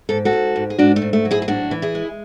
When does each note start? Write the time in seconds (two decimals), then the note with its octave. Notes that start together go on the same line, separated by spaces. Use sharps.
0.09 G#2 A4
0.25 F#4 A4
0.33 G#2
0.56 G#2
0.70 G#4
0.78 G#2 D4 F#4
0.96 A3
1.02 G#2
1.13 A3
1.25 F#3
1.31 E4 G#4
1.42 G#4
1.48 A2 D4 F#4
1.71 E3
1.82 E4 G#4
1.95 G#3